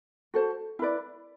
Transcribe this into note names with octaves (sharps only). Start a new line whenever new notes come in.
F#4 A4 C5
E4 B4 D5